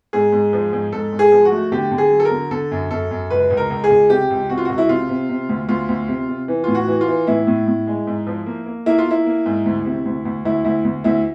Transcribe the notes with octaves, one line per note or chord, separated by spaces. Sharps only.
G#2 G#4
G#2
F3
G#2
G#2 A4
G#2
G#4
F3
F#4
A3
D3 G4
D3
G#4
F#3
A4
A#4
D3
D3 A4
F#2
F#2 A4
F#2
C#2 B4
C#2
A#4
C#2
G#4
C#2
C3 G4
C#2
C3 F#4
F4
C#2 F#4
E4
C3 F4
C3
C3
D2
D2 F4
D2
C3
C3
E3
A2 F4
F#4
E3
F4
E3
A2 E4
A2
A2
G#3
G#2
F3
A#3
A#3
A#3 E4
F4
A#3 E4
A#3
G#2
D2
C3
D2
D2
D2 E4
D2 E4
D2
D2 E4